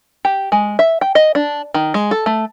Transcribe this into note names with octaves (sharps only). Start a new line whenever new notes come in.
G4
G#3
E5
G5
D#5
D4
D#3
G#3
A4
A3